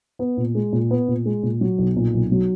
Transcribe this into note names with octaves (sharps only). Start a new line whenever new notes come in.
B3
A#2
G#3
A#2
B3
A#2
G#3
A#2
F#3
B1
A#2
B1
F#3